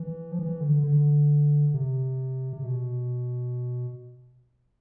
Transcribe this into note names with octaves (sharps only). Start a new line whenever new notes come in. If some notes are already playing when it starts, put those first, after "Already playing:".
Already playing: E3
F3
E3
D3
D3
C3
C3
B2